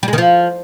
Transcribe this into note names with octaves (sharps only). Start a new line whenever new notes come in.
G3
G#3
D#3
F3